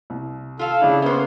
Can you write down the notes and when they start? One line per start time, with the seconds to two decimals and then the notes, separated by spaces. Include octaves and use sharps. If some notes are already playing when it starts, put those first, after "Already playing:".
0.10 C2
0.59 F4 A4 F5
0.81 C#3 D4 E4 G#4
1.02 A#3 B3 C#4 C5